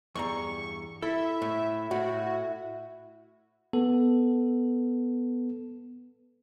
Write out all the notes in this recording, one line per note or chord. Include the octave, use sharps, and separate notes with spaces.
E2 G2 A#5 C#6
E4 A4 E5
A2
A2 F#4
B3 A4